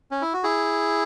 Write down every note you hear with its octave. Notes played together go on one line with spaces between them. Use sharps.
C#4
E4
F#4
E4 G#4